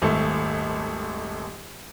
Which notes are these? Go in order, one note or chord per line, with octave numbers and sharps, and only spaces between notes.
D#1 G#1 A3 A4